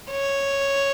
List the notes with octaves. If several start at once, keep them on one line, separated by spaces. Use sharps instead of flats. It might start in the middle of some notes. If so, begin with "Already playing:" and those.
C#5